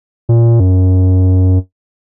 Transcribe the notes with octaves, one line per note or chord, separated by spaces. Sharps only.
A#2
F#2